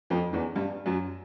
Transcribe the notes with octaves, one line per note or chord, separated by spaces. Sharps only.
F2 F3
E2 E3
G2 G3
F#2 F#3